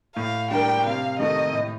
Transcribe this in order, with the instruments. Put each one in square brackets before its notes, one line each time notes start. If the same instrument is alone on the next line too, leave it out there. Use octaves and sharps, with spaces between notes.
[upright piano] A2 [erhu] F5
[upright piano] G3 D4 G4 A#4 [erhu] G5
[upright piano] C3 [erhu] F5
[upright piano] D#3 A3 D#4 A4 [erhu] D#5
[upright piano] A2